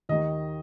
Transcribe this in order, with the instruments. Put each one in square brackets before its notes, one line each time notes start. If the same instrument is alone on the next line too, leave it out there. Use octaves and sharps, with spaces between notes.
[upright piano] D#2 D#3 D#5